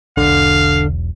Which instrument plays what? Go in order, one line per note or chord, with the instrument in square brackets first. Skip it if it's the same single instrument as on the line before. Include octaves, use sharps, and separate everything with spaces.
[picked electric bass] E1 B1 [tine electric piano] D3 [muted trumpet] F5